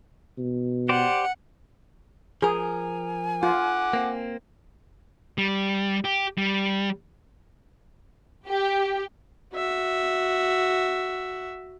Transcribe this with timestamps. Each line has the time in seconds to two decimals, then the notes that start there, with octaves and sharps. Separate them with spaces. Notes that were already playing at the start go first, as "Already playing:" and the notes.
0.38 B2
0.89 G4 C5 D5 F#5
2.42 F3 G#4 A#4 G#5
3.43 F4 F#5 D6
3.93 A#3 C4
5.38 G3
6.05 G4
6.38 G3
8.46 G4
9.53 F#4 E5